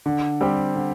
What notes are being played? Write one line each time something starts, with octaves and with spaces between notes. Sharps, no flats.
D3
G3 C4 G4
D3